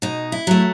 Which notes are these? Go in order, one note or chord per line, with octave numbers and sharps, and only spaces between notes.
B2 D#4
E4
F#3 A3